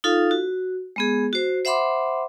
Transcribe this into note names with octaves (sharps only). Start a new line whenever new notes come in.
D#4 F4 A4 F5
F#4
G#3 B3 G#4
F#4 C5
C5 E5 F#5 B5 C6 D6